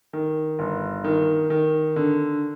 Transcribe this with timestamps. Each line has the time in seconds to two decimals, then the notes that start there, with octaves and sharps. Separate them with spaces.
0.13 D#3
0.59 G1
1.04 D#3
1.50 D#3
1.96 D3